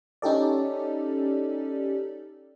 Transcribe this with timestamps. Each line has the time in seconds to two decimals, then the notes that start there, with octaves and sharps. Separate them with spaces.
0.22 C#4 D#4 G4 A4 D5